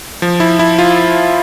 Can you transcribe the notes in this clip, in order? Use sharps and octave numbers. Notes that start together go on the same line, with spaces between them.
F3
E4
E4
F4